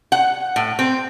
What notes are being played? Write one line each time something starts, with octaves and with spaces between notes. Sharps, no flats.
F#5
A2
C4